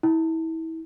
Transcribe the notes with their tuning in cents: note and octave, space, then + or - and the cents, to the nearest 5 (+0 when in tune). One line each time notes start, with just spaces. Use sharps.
E4 -30